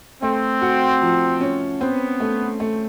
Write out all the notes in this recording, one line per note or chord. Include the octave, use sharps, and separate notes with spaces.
A3 C4
F#4
F3
C#4
B3 C4
A3
A3